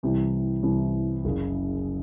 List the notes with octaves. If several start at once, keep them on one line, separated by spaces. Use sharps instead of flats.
C2 C3 E3 G3
C2 C3 E3 G3
F#1 F#2 C#3